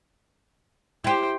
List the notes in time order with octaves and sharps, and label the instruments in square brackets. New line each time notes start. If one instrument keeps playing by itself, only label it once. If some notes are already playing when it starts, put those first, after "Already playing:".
[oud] E4 G4 [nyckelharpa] C5 G5